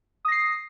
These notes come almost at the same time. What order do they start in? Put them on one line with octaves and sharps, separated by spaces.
D#6 A#6 C7